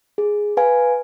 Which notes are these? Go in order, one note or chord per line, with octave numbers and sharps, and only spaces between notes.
G#4
B4 F5 G#5